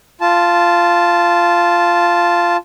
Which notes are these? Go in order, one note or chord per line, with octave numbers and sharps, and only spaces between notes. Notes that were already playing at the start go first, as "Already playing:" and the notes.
F4 A5